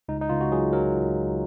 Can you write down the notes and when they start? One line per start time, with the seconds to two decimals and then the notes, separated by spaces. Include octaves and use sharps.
0.08 C#2 D#4
0.21 D#4
0.29 C#2 F4
0.41 F#4
0.51 F#3 G#4
0.73 F#3 A#4